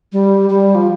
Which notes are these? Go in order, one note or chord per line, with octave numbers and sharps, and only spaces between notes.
G3
G3
F3